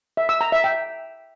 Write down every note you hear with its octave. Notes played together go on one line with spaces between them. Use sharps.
E5
E6
A#5
E5
G5